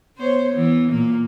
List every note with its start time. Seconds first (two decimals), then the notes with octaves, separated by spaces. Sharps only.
0.16 B3 C5 C#5
0.53 E3 B3
0.90 A#2 A#3